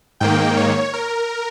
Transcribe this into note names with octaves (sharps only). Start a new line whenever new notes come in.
G#2 D#3 A#3 G5
C#5
A#4